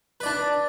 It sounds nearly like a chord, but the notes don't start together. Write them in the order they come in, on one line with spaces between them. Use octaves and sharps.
B4 D5 D4